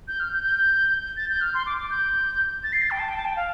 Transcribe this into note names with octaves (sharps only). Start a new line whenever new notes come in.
G6
F6
G6
G6
A6
G6
F6
C6
D6
D6
G6
A6
C7
A6
G5
A5
G5
A5
G5
F5